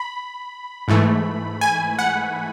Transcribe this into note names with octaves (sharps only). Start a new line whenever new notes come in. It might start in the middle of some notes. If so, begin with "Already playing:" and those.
Already playing: B5
G#2 E3 A3
G#5
F#5